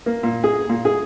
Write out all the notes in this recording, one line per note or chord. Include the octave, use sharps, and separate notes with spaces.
A#3
A#2
G#4
A#2
G#4